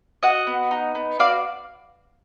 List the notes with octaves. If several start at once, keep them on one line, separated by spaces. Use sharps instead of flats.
F#4 D#5 F#5
B3
D#4
B3
F#4 D5 F5